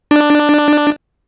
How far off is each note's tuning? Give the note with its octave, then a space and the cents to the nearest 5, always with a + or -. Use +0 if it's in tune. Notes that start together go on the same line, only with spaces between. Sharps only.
D4 +10